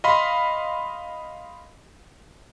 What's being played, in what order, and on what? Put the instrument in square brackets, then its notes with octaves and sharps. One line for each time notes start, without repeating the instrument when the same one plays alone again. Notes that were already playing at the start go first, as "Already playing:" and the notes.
[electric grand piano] D#5 F5 B5 C6